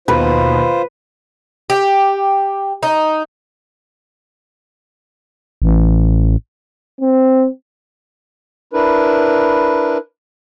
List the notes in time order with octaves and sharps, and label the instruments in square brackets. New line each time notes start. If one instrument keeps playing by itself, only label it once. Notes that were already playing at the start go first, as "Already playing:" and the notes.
[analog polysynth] D#2 B2 [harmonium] F4 C5 [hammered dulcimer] B4
[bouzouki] G4
D#4
[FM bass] A1
[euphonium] C4
[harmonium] D4 E4 A#4 B4